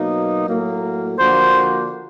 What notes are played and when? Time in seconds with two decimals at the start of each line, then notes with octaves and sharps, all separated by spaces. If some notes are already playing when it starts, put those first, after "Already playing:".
Already playing: B2 F#3 A#3 D#4
0.46 A2 F#3 A#3
1.18 D3 F3 A#3 D4 F#4 C5